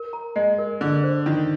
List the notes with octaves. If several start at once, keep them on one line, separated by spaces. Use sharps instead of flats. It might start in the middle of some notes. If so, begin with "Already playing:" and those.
Already playing: A#4
A#5
G#3 D#5
A#4
D3 G#4
C5
D#3 F4